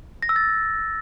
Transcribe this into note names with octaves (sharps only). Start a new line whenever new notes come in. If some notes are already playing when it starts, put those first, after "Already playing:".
A#6
E6
A6